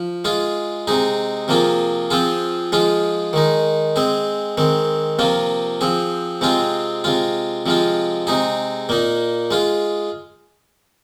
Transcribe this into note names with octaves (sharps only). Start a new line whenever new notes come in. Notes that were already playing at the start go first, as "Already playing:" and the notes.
Already playing: F3
G#3 F4 G#4
C3 G#3 D#4 G#4
C3 F3 A#3 F4 G#4
F3 C4 F4 G#4
F3 G#3 F4 G#4
D#3 G#3 D#4
G#3 C4 G#4
D#3 G#3 C4
C3 F3 A#3 F4
F3 C4 G#4
C3 G#3 C4 F4 G#4
C3 G#3 F4
C3 F3 G#3 F4
C3 G#3 D#4 G#4
A#2 A#3 D#4
G#3 F4 G#4